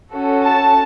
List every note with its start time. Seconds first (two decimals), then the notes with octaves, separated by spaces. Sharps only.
0.12 C#4 F#4 A4
0.44 A5